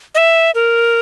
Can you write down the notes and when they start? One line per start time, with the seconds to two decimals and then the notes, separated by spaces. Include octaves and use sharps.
0.15 D#5
0.18 E5
0.55 A#4